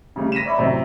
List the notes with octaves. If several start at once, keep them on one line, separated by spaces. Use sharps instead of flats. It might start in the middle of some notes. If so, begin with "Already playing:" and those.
C#3 G3 A3
A#6 B6 D#7 E7
C#5 D5 E5 B5
F#2 A2 C3